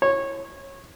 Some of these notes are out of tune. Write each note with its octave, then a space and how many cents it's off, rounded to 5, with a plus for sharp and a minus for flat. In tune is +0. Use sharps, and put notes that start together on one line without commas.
C#5 -20